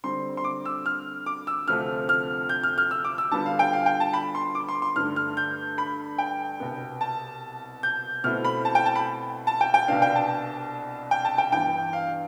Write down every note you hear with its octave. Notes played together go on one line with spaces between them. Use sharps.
D3 G3 C4 C6
C6
D6
E6
F6
D6
E6
D2 C3 F3 A3 C4 F6
F6
G6
F6
F6
E6
D6
E6
D3 G3 B3 F4 A5
F5
G5
F5
G5
A5
B5
C6
D6
C6
C6
G2 D3 A3 F6
F6
G6
B5
G5
C2 B2 B3
A5
G6
B2 A3 C4 E4 F6
B5
A5
G5
A5
B5
A5
G5
G5
C2 B2 B3 D4 F5
G5
A5
G5
A5
G5
G2 E3 B3 G5
F5